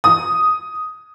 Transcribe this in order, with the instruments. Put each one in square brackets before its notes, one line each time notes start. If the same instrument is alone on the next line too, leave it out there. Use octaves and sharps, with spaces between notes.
[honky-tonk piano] D#6